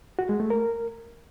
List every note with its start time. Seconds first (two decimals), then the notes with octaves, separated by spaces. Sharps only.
0.19 F#4
0.29 G#3
0.40 A3
0.50 A#4